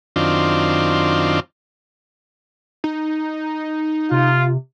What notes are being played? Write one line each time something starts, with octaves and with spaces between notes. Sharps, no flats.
F#2 D#3 C4 D4 F4
D#4
C3 F4